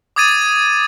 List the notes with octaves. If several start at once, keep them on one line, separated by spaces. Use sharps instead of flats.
D6 D#6 G#6 A6 D#7